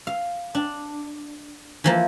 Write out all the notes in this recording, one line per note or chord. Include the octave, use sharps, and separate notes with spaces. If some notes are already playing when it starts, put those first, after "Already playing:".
F5
D4
E3 F3 A#3